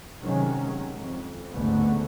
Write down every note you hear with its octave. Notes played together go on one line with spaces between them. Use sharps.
C3 D#3 F#3 G#3 C#4
F2
A1 D2 G#2 D3 A3 B3